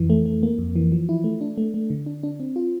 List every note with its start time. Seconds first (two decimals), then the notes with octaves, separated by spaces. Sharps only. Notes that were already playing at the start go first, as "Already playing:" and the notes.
Already playing: F2 E3
0.10 A3
0.25 A3
0.43 A#3
0.58 F2
0.76 E3
0.92 F3
1.09 E4
1.24 A3
1.41 D4
1.58 A3
1.74 A3
1.90 D3
2.06 D4
2.23 D4
2.40 C4
2.56 F4